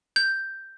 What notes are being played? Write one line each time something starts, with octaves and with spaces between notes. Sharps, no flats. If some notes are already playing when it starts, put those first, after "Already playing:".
G6